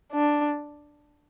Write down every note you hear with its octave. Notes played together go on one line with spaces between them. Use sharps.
D4